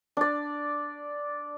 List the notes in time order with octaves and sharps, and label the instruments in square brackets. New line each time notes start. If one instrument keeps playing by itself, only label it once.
[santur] D4 D5